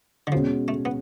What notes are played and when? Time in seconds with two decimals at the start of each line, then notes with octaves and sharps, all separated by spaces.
0.27 D3
0.32 B2 F3 G#3 C#4 F#4
0.68 A3
0.85 B3